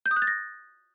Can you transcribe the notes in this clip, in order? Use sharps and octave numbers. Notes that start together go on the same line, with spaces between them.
G6
D#6
F#6
A6
A#6